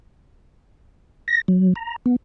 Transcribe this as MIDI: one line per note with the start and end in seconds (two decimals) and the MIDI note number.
1.28 1.41 94
1.48 1.74 54
1.76 1.96 82
2.06 2.16 59